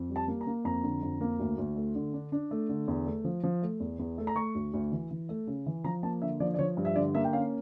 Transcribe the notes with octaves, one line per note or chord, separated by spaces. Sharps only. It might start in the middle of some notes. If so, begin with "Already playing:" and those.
Already playing: F2
G3
A5
A#3
A#5
A#3
F2 A#5
D3
F2
A#3
D2
D2
A3
D3
D4
D4
A3
D3
E2
A3
F3
F3
A3
E2
E2
A3
A#5
A3 C#6
D2
D2
E3
E3
A3
C#3
E3
F3 A#5
A#3 A5
D3 E5
F3 D5
D5
F3 C#5
G2
E5
D3 D5
A#3 E5
G5
C#4 F5